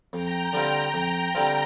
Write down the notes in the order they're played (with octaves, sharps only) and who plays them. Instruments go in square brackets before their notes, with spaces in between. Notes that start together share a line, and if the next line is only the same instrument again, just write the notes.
[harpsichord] F2 [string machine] G5 A#5
[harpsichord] D3 G3 C4 F4
[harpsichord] F2 [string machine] G5 A#5
[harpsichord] D3 G3 C4 F4